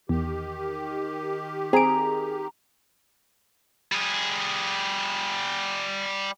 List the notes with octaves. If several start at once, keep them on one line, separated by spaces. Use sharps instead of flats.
E2 D#3 G4
C4 G#4 A#5 D7
G3 G#4